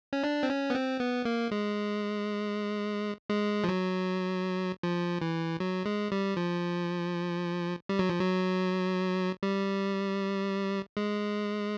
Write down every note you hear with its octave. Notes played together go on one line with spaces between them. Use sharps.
C#4
D4
C4
C#4
B3
C4
B3
A#3
G#3
G#3
F3
F#3
F3
E3
F#3
G#3
G3
F3
G3
F#3
F3
F#3
G3
G#3